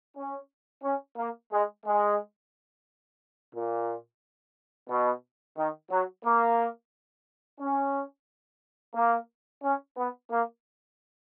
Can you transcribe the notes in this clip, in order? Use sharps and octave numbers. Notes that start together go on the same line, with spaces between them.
C#4
C#4
A#3
G#3
G#3
A#2
B2
D#3
F#3
A#3
C#4
A#3
C#4
B3
A#3